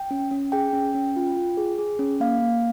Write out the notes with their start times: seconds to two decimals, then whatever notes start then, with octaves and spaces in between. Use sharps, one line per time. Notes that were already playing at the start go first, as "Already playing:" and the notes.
Already playing: G5
0.11 C#4
0.31 C#4
0.52 G#4 G5
0.73 C#4
0.94 C#4
1.16 F4
1.37 F4
1.57 G#4
1.79 G#4
1.99 C#4
2.20 A#3 F5
2.42 A#3